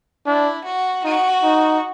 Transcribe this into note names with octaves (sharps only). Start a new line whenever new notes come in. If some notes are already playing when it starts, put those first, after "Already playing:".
D4 E4
F#4
D#4 F#4
D#4